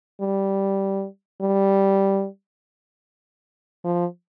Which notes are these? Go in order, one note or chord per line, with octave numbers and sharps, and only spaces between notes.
G3
G3
F3